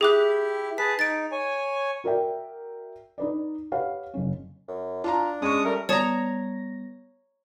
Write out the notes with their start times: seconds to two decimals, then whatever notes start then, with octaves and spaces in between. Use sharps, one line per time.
0.01 E4 G4 G#4 D6 F#6
0.78 G#4 B4 A5 B6
0.99 D#4 A6 D7
1.32 C#5 G#5
2.04 F#4 A#4 D5 E5 G5
3.18 D#4 B4 D5
3.72 G4 B4 C#5 F5 F#5
4.14 F#1 C#3 C#4
4.68 F#2
5.04 D4 F4 A5 A#5
5.42 G#3 C#4 C#6 D#6
5.64 G3 A3 A#4
5.89 G3 B3 C#5 D5 A5 A#5 D#6 A#6